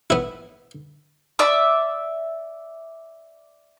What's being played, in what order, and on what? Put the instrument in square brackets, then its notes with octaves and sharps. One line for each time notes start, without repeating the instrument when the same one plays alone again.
[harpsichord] B3 E4
[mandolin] D5 E5 D#6